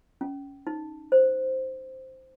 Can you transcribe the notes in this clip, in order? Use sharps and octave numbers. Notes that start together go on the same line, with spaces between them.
C#4
D#4
C5